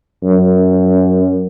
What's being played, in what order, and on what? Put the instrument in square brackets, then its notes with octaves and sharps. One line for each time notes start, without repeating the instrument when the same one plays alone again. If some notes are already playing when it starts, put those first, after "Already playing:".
[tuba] F#2